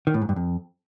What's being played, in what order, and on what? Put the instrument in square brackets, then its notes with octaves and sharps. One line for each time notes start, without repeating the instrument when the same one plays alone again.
[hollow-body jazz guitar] D#3
A2
G#2
G2
F2